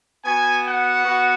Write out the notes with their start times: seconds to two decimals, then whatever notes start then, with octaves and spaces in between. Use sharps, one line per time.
0.25 B3 F#4 G#5
0.65 F#5
1.05 B3 F#4